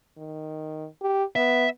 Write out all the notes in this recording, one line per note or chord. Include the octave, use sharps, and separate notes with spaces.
D#3
G4
B3 E5